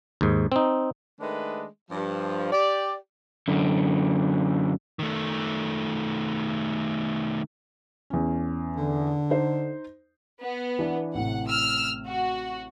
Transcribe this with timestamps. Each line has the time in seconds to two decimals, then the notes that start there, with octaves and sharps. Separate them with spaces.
0.21 D#2 G#2
0.52 C4 D#4
1.20 D#3 G#3 A3 D4 B4
1.90 G2 F3
2.52 G4 D5
3.48 F#2 D3
4.99 D#3 A3
8.10 E2 C#4
8.77 D3
9.30 D#4 C5
10.42 B3
10.79 E3 D4 E4
11.15 A1 A2 C3 F#5
11.49 E6 F6
12.07 F#4